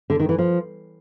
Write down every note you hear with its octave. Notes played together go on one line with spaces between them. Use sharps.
D3
D#3
E3
F3